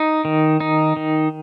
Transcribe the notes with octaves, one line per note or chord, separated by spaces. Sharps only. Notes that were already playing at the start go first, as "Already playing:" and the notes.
Already playing: D#4
D#3
D#4
D#3